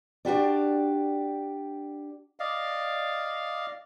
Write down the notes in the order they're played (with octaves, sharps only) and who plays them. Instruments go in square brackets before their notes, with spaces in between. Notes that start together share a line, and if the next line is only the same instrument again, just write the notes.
[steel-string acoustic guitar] D4 F#4 G4 D5
[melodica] D5 D#5 F5